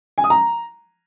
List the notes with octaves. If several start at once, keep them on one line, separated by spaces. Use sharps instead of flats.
G#5
D#6
A#5